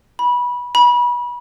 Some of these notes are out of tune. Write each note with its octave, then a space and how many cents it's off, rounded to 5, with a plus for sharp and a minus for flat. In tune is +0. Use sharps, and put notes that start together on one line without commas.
B5 -20
B5 -30